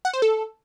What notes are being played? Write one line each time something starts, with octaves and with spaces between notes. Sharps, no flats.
F#5
C5
A4